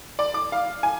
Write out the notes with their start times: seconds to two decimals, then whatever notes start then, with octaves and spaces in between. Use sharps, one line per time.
0.19 D5
0.34 D6
0.52 F5
0.83 G#5